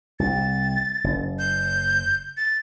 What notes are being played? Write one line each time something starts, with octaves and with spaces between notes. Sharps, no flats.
C2 A6
F#1
G6
A6